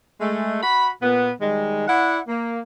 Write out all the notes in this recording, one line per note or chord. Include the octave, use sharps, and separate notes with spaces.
G#3 A3
F#4 B5
A#2 B3
D#3 G3 G#3
E4 D5 F#5
A#3